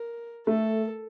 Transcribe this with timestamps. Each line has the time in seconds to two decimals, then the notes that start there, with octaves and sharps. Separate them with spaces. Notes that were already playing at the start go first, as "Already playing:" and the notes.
Already playing: A#4
0.47 A3 A4